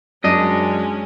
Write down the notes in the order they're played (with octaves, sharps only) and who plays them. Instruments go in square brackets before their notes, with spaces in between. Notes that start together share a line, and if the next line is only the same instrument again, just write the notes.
[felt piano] F#2 [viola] G#3 C#4 [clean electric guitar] D4 D#5